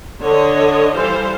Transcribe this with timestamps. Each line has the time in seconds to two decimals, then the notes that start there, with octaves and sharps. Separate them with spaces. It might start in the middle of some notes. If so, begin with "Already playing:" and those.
0.21 D3 D4 C#5 D#5
0.94 E3 G3 A4 C5 F5